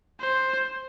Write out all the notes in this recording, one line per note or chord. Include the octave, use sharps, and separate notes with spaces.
C5